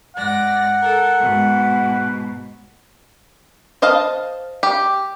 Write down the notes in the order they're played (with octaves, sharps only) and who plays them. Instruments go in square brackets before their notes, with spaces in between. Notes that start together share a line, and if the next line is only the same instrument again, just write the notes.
[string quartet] G#2 D5 A#6 [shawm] F#5
[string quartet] A4 A#4
G#2 B2
[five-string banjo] C5 D#5 F5 A5
G4